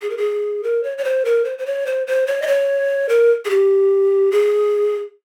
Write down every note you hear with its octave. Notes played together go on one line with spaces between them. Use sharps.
G#4
A#4
G#4
A#4
C#5
C#5
C5
A#4
C5
C5
C#5
C5
C5
C#5
D#5
C#5
A#4
G#4
G4
G#4